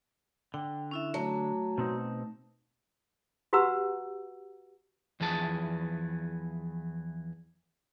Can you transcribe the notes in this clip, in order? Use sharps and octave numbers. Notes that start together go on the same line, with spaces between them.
D3 G5
C#4 E4 E5
F#3 A3
B2 C4 D#4
F#4 G4 B4 F#5 A#5 E6
E2 E3 F3 G#4 A5